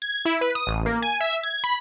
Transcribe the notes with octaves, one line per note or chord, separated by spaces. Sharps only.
G#6
E4
B4
D#6
A1
A#3
G#5
E5
G#6
B5